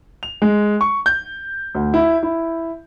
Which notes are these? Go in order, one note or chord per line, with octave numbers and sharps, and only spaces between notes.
F7
G#3
C#6
G6
D2
E4
E4